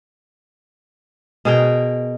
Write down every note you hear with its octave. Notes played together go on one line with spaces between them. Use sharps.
B2 G#4 A#4 G5